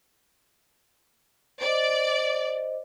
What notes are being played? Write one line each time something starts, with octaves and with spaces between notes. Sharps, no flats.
C5 D5 D#5